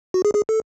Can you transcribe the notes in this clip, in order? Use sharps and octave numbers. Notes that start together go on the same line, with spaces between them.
F#4
G#4
G#4
A4